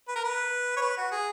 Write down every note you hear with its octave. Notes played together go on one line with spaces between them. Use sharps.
B4
A#4
B4
C#5
B4
F#4
G#4